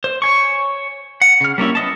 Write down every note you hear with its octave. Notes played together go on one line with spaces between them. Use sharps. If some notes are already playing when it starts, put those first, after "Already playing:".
C5
C#5 G#5 C#6
F#5
C#3 F6
G3 A#3 C#4 E4
B3 D#5 A5